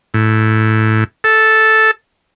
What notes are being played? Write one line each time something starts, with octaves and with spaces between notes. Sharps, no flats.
A2
A4